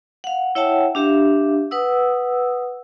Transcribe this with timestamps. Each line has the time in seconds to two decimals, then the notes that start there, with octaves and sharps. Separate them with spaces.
0.24 F5 F#5
0.55 E4 C#5 E5 F#5 G5 A5
0.95 D4 G4 E5 F5
1.71 B4 F#5 D#6 E6